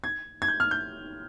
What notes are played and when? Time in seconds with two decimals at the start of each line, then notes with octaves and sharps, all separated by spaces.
0.04 G#6
0.42 G#6
0.48 G6
0.60 F6
0.71 G6